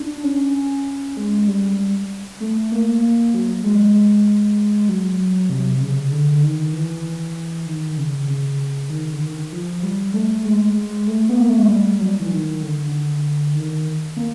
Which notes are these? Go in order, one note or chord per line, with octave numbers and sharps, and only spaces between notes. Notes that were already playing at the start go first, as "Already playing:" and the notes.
Already playing: D4
C#4
G#3
G3
A3
A#3
F#3
G#3
F#3
C3
C3
C#3
D3
D#3
E3
D#3
C#3
C#3
D#3
D3
D#3
F3
G3
A3
G#3
A3
B3
A#3
A3
G#3
G3
F#3
E3
D#3
D3
D3
D#3
A#3